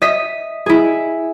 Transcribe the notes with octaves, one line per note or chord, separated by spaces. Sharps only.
D#5 E5 B6
E4 G#4